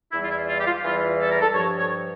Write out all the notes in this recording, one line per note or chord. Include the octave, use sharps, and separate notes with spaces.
E2 E3 G3 E4
F4
E4
F4
G4
F4
E2 E3 G3 F4
A4
A#4
A4
G2 F3 C#5
C#5